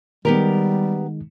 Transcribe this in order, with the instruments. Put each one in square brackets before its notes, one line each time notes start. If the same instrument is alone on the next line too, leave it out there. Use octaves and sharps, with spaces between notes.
[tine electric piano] D#3 G#3 D#4 [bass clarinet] G3 [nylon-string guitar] B3 G4 A#4